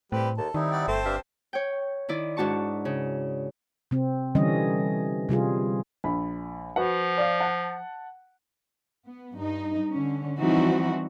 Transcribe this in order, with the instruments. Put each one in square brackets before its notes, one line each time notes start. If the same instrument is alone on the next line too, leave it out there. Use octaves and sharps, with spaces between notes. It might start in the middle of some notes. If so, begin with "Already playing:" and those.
[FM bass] A2 [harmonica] G3 B4 [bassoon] C4
[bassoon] D#2 [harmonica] A4 [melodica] A5
[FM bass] D#3 [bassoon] G3 [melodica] C4 D#4 E4
[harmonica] D5 F#5 G5
[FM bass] G1 [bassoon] A3 [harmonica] C4 C5 A5
[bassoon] G2 [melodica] D4 E5 F5
[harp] C#5 G5
D#3 E4 D5
G#2 D4 F#4 A5 C#6
C#3
[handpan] C3 C4
D3 E3 G3 C#4 D#5
C3 G3 F4 G#4
[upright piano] A#1 B5
[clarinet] F3 [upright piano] F#4 B4 F#5
[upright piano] D5 F5
F#5 A5
[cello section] B3
G2 D#4
D3 C#4
E3 F3 G3 C4 D#4 F#4